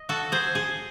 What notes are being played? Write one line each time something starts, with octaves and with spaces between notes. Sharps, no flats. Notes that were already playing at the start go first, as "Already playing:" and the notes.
Already playing: D#5
F#4 A4
G#4 C5
G#4